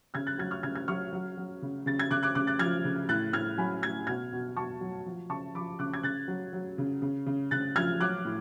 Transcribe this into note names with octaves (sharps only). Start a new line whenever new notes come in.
C#3 F6 G#6
F#6 A6
F#3 F6 G#6
C#6 F6
C#3 F6 G#6
F6 G#6
F#3 C#6 F6
F#3
F#3
C#3
C#3 A6
G#6
C#3 D6 F#6
D6 F#6
C#3 D6 F#6
F#6 A6
F3 F6 G#6
C#3
A2 F#6 A6
A2 F6 G#6
F#3 G#5 B5
A2 F6 G#6
B2 F6 G#6
B2
B2 A5 C#6
F#3
F3
C#3 A5 C#6
F3 B5 D6
C#3 D6 F#6
G#6
C#3 F#6 A6
F#3
F#3
C#3
C#3
C#3
C#3 F#6 A6
F3 F6 G#6
F#3 D6 F#6
A2